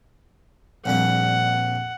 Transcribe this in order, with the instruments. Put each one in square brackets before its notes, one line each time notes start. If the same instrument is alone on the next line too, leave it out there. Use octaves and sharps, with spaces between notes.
[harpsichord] A#1 F2 G3 [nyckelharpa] F#5